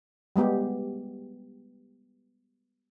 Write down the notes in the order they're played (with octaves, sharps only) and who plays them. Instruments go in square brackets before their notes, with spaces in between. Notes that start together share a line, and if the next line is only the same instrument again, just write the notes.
[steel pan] G3 G#3 B3 G4